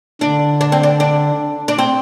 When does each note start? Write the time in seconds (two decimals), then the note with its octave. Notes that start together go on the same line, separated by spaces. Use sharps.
0.21 D3 D4
0.61 D4
0.72 C4
0.83 D4
1.00 D4
1.68 D4
1.78 C4